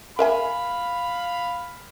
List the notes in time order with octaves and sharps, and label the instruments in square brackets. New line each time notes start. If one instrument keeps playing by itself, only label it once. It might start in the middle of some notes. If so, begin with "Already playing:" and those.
[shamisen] A#4 E5 G#5 [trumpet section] F5 B5